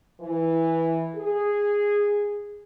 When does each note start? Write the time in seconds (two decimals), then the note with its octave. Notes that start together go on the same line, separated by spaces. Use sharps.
0.20 E3
1.15 G#4